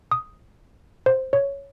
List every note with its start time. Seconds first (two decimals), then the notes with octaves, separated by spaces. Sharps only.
0.12 D#6
1.06 C5
1.33 C#5